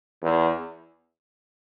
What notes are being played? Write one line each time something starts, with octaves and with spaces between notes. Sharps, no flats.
E2